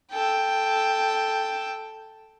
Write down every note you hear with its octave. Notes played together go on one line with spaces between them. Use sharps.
A4 G5